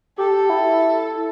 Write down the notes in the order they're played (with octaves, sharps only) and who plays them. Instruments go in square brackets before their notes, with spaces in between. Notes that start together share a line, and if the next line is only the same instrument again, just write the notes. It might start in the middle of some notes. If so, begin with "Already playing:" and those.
[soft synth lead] G4 [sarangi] A4
[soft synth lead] E4